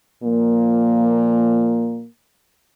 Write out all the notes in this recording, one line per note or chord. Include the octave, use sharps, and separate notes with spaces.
A#2 F3 A#3